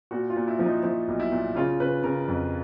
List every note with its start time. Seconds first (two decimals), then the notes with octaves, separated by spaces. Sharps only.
0.11 A#2 F#4
0.30 F4
0.36 A#2
0.48 E4
0.59 F3
0.65 D#4
0.83 F3 E4
1.08 B1
1.20 E4
1.32 A#2
1.56 C#3 F4
1.80 C#3 B4
2.04 C#3 A#4
2.28 F2